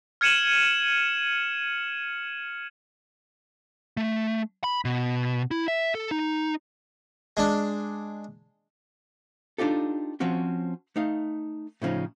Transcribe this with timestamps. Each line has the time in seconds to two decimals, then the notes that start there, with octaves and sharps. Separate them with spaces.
0.21 F6 G#6 C#7 D#7 E7 F#7
3.97 A3
4.64 B5
4.85 B2
5.51 E4
5.68 E5
5.95 A4
6.11 D#4
7.37 G#3 D4
9.58 D4 D#4 F4 G4 A4
10.20 F3 C4 C#4 F#4
10.96 A3 D#4 F5
11.82 A2 C#3 F3 C#4 D#4